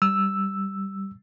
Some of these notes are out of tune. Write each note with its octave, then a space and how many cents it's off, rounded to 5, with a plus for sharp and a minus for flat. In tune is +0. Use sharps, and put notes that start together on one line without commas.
G3 -5 E6 +0